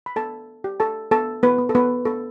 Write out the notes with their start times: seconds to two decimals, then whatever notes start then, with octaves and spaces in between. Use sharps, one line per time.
0.06 B5
0.16 B3 A4 A5
0.64 G4
0.80 A4 A5
1.11 B3 A4 A5
1.43 B3 B4
1.58 B3
1.69 A4
1.75 B3 B4
2.05 B3 A4